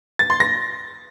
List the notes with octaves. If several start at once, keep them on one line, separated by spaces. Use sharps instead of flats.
A6
C6
A#6